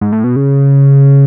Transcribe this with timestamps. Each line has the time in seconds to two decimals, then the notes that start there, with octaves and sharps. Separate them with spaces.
0.01 G#2
0.12 A2
0.24 B2
0.36 C#3